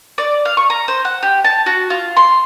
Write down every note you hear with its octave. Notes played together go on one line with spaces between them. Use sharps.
D5
F5
C#6
A#5
C5
F#5
G4
A5
F#4
F4
C6